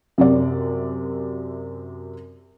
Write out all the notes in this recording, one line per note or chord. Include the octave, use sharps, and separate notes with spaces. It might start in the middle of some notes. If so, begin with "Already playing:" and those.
F#2 C3 D5